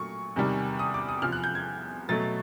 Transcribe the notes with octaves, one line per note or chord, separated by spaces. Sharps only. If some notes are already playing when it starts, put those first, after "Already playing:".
Already playing: A#2 F#3 A3 C#6
E2 C3 D#3 G3
D#6
D6
D#6
E2 C3 F3 F6
F#6
G6
G#6
B2 F#3 A3 A6